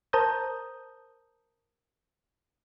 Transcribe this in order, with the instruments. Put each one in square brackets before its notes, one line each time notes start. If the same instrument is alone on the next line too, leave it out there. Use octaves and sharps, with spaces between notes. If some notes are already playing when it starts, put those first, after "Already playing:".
[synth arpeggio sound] A#4 C5 A5 A#5 D#6 G6